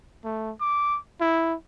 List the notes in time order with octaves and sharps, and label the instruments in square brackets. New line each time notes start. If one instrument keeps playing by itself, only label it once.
[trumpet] A3
D6
E4